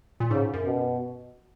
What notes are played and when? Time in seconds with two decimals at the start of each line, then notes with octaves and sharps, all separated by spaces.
0.20 A#2
0.31 G#2 C#3
0.54 F#2
0.65 B2